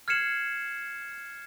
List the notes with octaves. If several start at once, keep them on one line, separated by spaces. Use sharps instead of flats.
F6 G#6 C7 C#7 E7 F#7